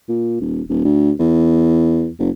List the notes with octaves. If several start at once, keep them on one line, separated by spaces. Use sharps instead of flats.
A#2
D#1
D#1
D2
E2
F#1